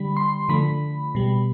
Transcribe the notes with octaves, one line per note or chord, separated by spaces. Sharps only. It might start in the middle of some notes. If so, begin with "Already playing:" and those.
Already playing: D3 G3 B5
C6
D3 F3 A3 B5
B2 G3